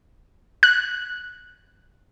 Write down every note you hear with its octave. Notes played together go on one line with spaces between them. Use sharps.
F#6